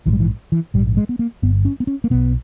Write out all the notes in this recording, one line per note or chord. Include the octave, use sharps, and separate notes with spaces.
A#1 G#2 E3
G3
E3
E3
A#1 G#2 G3
G#3
B3
A#3
G1 G2 B3
C#4
B3
C#4
A#3
B1 B2 B3